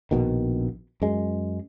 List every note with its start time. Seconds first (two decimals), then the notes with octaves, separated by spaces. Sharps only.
0.11 A#1 B2 D#3
1.02 F#2 G#3